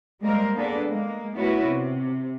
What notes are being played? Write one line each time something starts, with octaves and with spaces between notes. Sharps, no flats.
G3 G#3 A#3 A#4 C5
A#3 B3 D4 G#4 A4 B4
G#3 A#3
A3 B3 C#4 E4 F#4 B4
C3